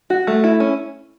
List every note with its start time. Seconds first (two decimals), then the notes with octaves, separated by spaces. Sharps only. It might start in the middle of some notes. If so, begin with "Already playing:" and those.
0.10 F#4
0.27 A3
0.44 E4
0.60 C#4